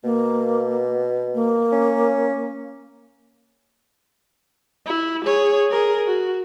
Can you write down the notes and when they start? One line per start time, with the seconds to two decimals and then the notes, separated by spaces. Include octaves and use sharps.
0.04 B2 A#3
1.34 A#3
1.72 C#4
4.86 E4
5.25 G#4 C#5
5.71 G#4 A#4
6.07 F#4